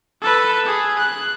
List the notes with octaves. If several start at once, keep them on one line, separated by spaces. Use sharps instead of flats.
A4 B4
G#4
F#6